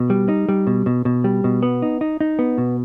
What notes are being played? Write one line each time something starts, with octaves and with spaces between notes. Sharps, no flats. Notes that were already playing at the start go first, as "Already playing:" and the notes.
Already playing: B2
G3
D#4
G3
B2
B2
B2
G3
B2
B3
D#4
D#4
D#4
B3
B2